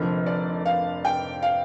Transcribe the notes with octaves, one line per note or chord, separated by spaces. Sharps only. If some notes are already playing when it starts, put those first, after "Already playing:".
Already playing: F1 F2 D3 F3 A#4
D5
F5
G5
F5